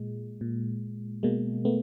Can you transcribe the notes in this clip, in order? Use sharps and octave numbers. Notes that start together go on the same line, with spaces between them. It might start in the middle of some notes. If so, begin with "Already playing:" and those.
Already playing: A#2 G#3
A#2
B2 G#3 A#3
A3 B3